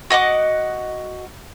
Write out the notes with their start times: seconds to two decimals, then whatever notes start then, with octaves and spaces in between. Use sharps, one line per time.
0.10 F#4 D#5 F#5 D6